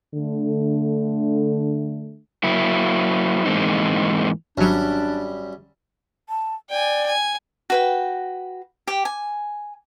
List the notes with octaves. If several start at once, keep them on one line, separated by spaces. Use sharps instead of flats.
D3 A3
F#3 A#3 E4
G#2 E3 G#3 A#3 C4 D#4
G#1 F#2 F#3 G3 D4
A5
D5 G5 G#5
G#5
F#4 B4 G5
G4 G5
G#5